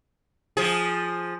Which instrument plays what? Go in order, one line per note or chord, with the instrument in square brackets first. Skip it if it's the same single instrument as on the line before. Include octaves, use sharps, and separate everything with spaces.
[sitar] F3 G#4